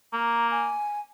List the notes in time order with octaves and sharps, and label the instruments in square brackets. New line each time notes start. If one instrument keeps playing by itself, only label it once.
[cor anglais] A#3 [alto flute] A#5
[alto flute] G#5